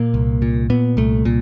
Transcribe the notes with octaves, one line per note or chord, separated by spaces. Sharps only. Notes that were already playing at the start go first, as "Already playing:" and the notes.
Already playing: A#2 A#3
C2
A#2
A#2 B3
C2 A3
A#2